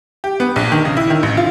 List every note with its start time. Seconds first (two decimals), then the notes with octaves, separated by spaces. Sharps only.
0.24 G4
0.40 B3
0.56 A#1
0.72 D#3
0.85 C#3
0.97 E4
1.10 D#3
1.23 A1
1.37 F4